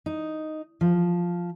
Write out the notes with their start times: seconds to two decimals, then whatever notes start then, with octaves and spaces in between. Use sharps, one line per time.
0.06 D#4
0.81 F3